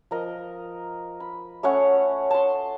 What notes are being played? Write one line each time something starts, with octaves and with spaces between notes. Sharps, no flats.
F3 A#4 D#5
B5
A3 C#4 C#5 F#5
A5 C6